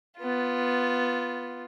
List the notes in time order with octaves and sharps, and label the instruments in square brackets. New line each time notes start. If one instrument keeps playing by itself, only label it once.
[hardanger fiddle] B3 F4